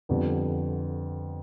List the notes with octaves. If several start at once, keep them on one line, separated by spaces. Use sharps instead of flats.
F2 D3 G3 B3